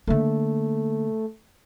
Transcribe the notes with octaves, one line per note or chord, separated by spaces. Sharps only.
D3 A3 A#3